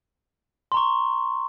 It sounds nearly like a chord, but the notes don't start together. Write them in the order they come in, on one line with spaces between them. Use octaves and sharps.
C6 A#5 C#6